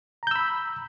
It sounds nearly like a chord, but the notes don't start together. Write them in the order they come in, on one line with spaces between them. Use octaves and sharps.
A#5 G6 E6 B5